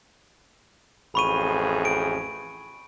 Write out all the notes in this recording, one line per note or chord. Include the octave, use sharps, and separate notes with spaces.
A1 F2 G#4 B5 C#6 D#7
D7